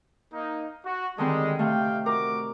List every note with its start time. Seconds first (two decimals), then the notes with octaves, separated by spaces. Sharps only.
0.33 A#3 D#4
0.84 F#4
1.18 D3 D#3 G3 G#3 C4
1.59 C3 A3 G4 F5 G5
2.06 F#4 A#4 D6